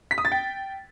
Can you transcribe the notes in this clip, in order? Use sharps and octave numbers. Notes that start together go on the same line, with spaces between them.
B6
D#6
A6
G5